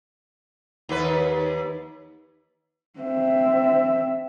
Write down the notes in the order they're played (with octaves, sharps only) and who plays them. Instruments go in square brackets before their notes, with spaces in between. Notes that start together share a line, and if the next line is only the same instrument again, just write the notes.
[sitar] D#2 B4
[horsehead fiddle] C4 E5